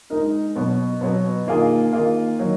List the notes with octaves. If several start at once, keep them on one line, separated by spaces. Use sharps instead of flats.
G#3 D#4 A#4
B2 F#3 B3
B2 F#3 B3
D#3 A#3 F4 G#4
D#3 A#3 F4 G#4
D#3 F#3